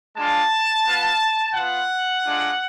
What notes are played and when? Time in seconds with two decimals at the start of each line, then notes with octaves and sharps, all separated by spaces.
0.16 G#3 D4 F4 A5
0.85 B3 F4
1.55 B3 F4 F#5
2.24 G#3 D4 F4